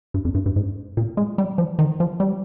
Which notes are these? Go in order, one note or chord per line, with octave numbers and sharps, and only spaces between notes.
G2
F2
G2
G2
G#2
A#2
G#3
G3
F3
D#3
F3
G3